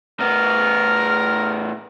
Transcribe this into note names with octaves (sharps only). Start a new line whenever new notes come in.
A2 B3 A#4